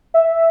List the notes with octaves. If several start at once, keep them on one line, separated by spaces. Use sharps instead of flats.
E5